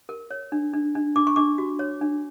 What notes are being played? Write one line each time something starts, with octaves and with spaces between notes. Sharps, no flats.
A#4
C#5
D4
D4
D4
D4 D6
C#6
D4 D6
F#4
C#5
D4